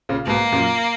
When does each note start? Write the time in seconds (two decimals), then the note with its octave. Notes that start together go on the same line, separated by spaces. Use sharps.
0.09 A#2 C#3
0.26 G#2 B2 A#3
0.52 F#2 A#2